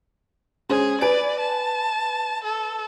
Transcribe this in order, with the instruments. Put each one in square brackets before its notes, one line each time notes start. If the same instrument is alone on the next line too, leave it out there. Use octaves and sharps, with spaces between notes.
[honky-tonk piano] G#3 C#4 C5 [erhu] G#4
[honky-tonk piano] B4 G#5 D7 [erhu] D5
[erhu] A5
A4